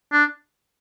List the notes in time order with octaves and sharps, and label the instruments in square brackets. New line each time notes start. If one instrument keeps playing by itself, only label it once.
[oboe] D4